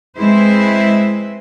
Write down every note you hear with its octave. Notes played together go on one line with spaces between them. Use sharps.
G#3 C4 E4 B4 C5